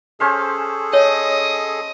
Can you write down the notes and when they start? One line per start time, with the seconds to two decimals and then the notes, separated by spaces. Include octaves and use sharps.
0.20 C#4 G#4 A4 C5 F5
0.93 C#5 D#5